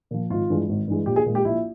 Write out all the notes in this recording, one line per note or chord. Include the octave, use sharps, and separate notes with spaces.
A#2 F3
G#1 F4
G2 E3 G#3
G#1
G2 E3 G#3
A#1 G4
G#4
A#2 G#3
G4
A#1 E4